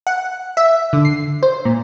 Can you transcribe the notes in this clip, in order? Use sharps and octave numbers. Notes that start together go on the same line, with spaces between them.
F#5
E5
D3
C7
C5
A#2